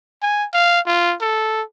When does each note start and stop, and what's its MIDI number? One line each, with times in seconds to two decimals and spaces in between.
0.22 0.46 80
0.53 0.80 77
0.87 1.15 65
1.21 1.62 69